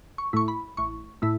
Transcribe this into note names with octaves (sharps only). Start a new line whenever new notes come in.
C#6
A2 A3 E4 C#6
B5
A1 C#6
A2 A3 E4